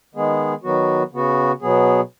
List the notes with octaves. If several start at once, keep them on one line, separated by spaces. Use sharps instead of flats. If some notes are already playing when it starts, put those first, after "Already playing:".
D#3 G#3 B3 G#4
D#3 F#3 B3 F#4
C#3 B3 F#4
B2 F#3 B3 G#4